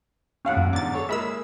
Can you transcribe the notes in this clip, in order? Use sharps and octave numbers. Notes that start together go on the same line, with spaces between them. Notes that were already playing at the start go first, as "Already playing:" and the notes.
D#2 A2 C#4 F5 F#5
F#2
E2 G#2 D3 D6 A6
G#4 A4 C#5
G#3 A#3 E5 B5 E6